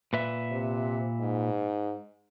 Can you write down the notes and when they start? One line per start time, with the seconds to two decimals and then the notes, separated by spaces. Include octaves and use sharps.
0.13 A#2 B4 E5
0.51 C3
1.19 G#2